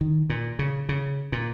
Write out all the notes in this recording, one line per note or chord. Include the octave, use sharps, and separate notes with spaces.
D#3
A#2
C#3
C#3
A#2